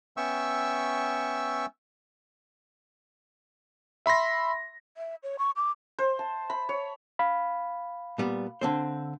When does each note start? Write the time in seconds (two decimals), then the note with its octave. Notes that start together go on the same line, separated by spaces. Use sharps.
0.17 B3 C#4 E5 G5 C#6 E6
4.06 E5 B5 C6 A#6
4.97 E5
5.23 C#5
5.39 C#6
5.56 D6
5.99 C5
6.19 A5
6.50 B5
6.69 C#5
7.19 F5 B5
8.18 A#2 G3 B3
8.61 D3 C4 C5